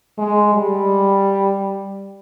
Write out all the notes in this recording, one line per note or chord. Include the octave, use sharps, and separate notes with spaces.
G#3
G3